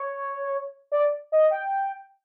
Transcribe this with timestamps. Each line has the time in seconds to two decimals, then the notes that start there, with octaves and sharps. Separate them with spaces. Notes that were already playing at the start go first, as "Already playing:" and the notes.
Already playing: C#5
0.92 D5
1.32 D#5
1.51 G5